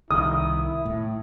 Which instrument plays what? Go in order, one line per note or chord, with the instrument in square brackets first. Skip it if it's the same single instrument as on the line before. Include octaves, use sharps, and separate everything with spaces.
[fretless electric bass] C2 D#3 [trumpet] E4 [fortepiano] D#6
[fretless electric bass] A2